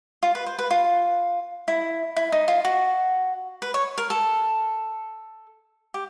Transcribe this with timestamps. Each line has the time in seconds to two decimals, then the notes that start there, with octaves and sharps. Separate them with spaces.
0.23 F4
0.35 B4
0.46 C5
0.59 B4
0.71 F4
1.68 E4
2.17 E4
2.32 D#4
2.48 F4
2.65 F#4
3.62 B4
3.74 C#5
3.98 A#4
4.10 A4
5.94 G4